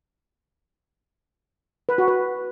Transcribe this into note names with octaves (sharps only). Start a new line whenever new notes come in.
B4
F#4
B4